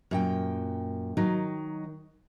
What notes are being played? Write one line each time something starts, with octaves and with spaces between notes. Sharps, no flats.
F#2 A#2 G5
D#3 F#3 D#4